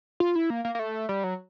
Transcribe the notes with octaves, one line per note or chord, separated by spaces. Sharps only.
F4
E4
A#3
A#3
A#3
A3
G3
F#3